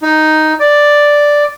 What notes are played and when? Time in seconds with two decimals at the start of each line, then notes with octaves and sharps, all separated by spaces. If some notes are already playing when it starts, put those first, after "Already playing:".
0.02 D#4
0.60 D5